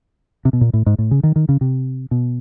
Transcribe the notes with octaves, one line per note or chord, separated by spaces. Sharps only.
C3
B2
A#2
A2
G#2
A2
C#3
D#3
D#3
C#3
C3
B2